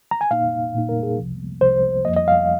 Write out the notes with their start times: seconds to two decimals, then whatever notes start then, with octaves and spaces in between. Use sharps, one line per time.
0.11 A#5
0.21 G#5
0.31 A#2 A#3 D#4 F5
0.74 A#2 A#3 D#4
0.89 A#4
1.03 G#4
1.18 C2 C3 F3
1.61 C2 C3 F3 C5
2.05 F2 F3 A#3 D#5
2.16 D#5
2.28 F5